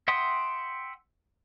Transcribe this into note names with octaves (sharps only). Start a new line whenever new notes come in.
E5 F#5 G5 C6 D#6